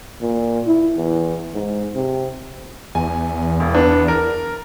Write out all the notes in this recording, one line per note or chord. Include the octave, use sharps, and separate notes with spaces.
A#2
E4
E2
G#2
C3
E2 G#5
E1
B3 D4
A#4